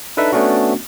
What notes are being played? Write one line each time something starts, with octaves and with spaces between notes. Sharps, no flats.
D4 D#4 A4 B4 E5
A3 B3 C#4 D4 F#4